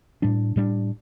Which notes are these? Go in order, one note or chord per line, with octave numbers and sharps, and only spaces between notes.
A2 G3 D4
A2 G3 D4